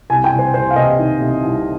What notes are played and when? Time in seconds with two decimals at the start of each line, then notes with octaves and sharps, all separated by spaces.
0.10 C2 G#5
0.24 G5
0.32 C2
0.39 C5
0.54 C2 C5
0.70 F5
0.76 C3 D#5
0.99 D#3
1.21 C3
1.43 C2